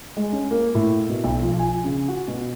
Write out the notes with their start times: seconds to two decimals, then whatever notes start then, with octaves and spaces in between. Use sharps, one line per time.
0.17 G#3
0.33 C#4
0.51 A#3
0.75 A2
1.09 B2
1.24 B1
1.42 F3
1.59 G#5
1.84 C#3
2.08 F#4
2.28 B2